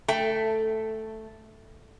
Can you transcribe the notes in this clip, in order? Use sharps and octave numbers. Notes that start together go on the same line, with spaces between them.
A3 G5